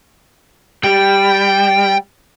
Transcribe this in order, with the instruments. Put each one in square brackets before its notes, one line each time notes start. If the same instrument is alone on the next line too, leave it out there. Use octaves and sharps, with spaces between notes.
[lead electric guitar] G3 [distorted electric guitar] G5